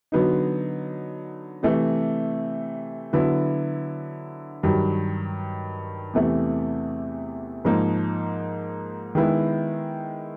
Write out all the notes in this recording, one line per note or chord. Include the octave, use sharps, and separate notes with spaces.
D3 F#3 B3 D#4
C3 E3 A3
D3 F#3 B3 E4
G2 D#3 F#3
E2 C3 E3 A3
G#2 F3 A#3 D#4
D#3 G#3 B3 E4